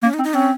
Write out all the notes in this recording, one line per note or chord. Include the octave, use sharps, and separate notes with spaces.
A#3 C#4
D#4
C4
D#4
C4 C#4